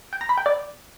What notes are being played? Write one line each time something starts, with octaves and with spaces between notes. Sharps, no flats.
G5
A#5
B5
G5
D5